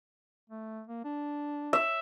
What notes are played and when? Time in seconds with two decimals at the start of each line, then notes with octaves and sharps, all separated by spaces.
0.50 A3
0.87 A#3
1.05 D4
1.73 E5